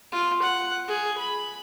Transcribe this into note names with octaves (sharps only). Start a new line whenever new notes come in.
F4
F#5
G#4
B5